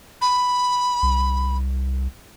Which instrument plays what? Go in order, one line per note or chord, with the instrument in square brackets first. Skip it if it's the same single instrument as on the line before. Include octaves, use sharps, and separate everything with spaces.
[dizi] B5
[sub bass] C2